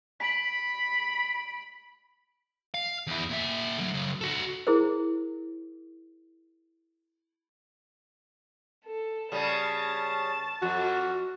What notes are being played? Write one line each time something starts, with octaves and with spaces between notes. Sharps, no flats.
B5 B6 D7 F#7
F5
E2 E4
A#2 E5
D3 F#3
C#3 F#3
F#4 A4
E4 G#4 A#4 C5
A4
C#3 G3 A5 A6
F2 F#4